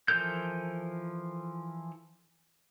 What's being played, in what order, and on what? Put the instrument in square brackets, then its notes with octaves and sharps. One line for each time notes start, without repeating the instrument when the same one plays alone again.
[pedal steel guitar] E3 F3 A4 A#4 G6